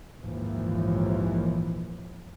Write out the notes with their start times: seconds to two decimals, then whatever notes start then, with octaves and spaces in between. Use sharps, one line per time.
0.21 A#1 D#2 G#2 E3 F3